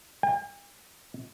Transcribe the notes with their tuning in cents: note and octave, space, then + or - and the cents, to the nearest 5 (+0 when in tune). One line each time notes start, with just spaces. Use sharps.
G5 +45